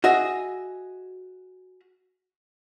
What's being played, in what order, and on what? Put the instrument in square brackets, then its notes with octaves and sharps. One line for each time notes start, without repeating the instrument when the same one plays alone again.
[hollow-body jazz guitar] F#4 G#4 D#5 E5